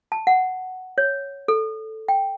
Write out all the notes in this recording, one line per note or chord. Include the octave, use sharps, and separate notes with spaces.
A5
F#5
C#5
A4
G5